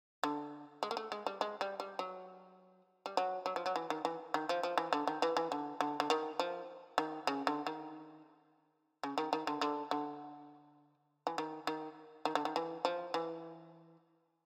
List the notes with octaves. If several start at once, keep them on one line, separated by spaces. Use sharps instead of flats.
D3
G#3
A#3
A3
G#3
G3
G#3
G3
G3
F#3
G3
F#3
F#3
F3
F#3
E3
D#3
E3
D#3
F3
F3
E3
D3
D#3
E3
E3
D3
D3
D3
D#3
F3
D#3
C#3
D3
D#3
C#3
D#3
D#3
D3
D3
D3
E3
D#3
D#3
D#3
D3
D#3
E3
F3
E3